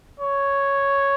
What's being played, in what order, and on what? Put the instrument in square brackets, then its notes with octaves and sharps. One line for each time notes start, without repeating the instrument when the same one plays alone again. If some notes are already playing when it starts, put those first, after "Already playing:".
[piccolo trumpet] C#5